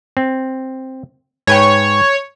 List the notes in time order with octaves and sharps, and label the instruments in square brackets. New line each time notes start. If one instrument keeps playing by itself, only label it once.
[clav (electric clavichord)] C4
[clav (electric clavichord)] G#2 B4 G5 [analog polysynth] C#5